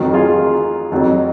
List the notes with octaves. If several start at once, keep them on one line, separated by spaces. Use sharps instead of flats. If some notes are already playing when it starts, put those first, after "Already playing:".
Already playing: F2 D#3 F#3
F4 G#4
F2 D#3 F#3